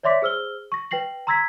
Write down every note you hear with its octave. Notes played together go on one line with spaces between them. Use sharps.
C#5 D5 E5 C6 D6 B6
G#4 C5 E6 F6 G7
C#6 A#6
B4 G5 A#6 C7 F#7
A#5 C6 E6 G#6 A#6 B6